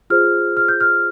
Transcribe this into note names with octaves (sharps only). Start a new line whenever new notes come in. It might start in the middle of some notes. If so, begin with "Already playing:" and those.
F4 G#4 C5 F6
F6
G6
F6